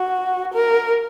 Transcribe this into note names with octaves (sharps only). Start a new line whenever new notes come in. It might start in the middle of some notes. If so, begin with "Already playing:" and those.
Already playing: F#4
A#4